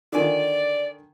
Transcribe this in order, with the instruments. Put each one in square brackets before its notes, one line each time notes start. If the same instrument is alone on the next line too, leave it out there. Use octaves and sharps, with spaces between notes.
[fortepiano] D3 D#3 G#5 [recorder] D5